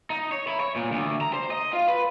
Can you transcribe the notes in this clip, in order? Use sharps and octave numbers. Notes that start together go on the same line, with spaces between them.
D#4
C#5
E4
C#5
A#2
D2
A#5
C5
D#5
F4
B4